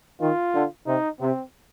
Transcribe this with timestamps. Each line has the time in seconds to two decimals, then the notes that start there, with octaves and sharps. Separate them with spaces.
0.20 D#3 F4
0.54 D3
0.86 C3 D#4
1.20 C3 C4